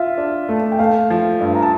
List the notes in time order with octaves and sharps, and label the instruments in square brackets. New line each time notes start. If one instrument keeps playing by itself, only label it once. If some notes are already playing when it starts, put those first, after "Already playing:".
Already playing: [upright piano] F4 [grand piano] E5
[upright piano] D4
A3
[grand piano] G5
[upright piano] A3 [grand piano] F5
[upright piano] F3
G2
[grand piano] A#5
A5